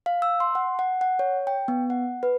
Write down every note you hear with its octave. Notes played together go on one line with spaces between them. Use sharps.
F5
E6
C6
F#5
F#5
F#5
C#5
G5
B3
F#5
B4